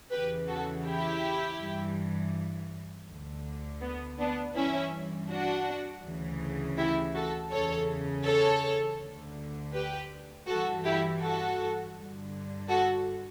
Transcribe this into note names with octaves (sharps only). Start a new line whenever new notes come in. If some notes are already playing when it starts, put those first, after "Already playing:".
E2 C#3 E3 G4 B4
F#4 A4
E4 G4
G2 E3
D2 D3
B3
B3 D4
G2 E3 C#4 E4
D4 F#4
D2 C#3 E3
E4 G4
F#4 A4
E2 C#3 E3 A4 C#5
A4 C#5
D2 D3
G4 B4
G2 E3 F#4 A4
E4 G4
F#4 A4
G2
D3
F#4 A4